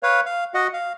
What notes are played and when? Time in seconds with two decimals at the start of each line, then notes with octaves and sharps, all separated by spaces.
0.03 B4 C#5 F5
0.26 F5
0.54 F#4 D#5 F#5
0.73 F5